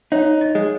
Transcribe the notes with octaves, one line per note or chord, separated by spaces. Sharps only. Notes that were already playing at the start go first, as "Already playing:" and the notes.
D#4 C#5
D#5
G#3